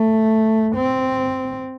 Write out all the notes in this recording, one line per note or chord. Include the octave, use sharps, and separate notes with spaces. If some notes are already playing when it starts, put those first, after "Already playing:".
Already playing: A3
C4